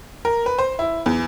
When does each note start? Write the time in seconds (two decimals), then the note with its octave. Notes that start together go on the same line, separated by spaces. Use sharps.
0.25 A#4
0.46 B4
0.59 C5
0.79 E4
1.06 E2